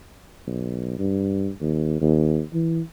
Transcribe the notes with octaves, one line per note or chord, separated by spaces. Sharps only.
B1
G2
D#2
D#2
E3